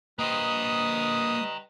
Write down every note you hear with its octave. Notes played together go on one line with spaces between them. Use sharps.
G3 A#3 B4 C5 D#5 G5 A#5 D#6